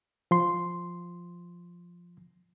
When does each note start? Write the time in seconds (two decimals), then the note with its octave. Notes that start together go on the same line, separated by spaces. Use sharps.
0.31 F3 C6